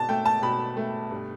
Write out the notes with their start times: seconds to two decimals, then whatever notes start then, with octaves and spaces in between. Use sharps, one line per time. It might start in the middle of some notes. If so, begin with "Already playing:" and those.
Already playing: B2 A5
0.09 A3 G5
0.25 A5
0.42 B2 B5
0.77 A3
1.11 G2